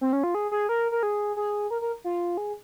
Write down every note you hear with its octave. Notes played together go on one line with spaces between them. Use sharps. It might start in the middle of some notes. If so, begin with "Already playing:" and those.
C4
C#4
F4
G#4
G#4
A#4
A#4
G#4
G#4
A#4
A#4
F4
G#4